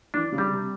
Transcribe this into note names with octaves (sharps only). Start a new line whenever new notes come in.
E3 D4
C#3
G3
C3